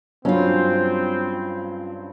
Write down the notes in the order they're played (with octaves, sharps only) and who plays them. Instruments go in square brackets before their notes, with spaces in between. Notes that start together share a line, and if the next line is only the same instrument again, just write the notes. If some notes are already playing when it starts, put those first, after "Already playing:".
[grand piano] G2 F#3 [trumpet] C4 [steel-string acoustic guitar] C#4 F4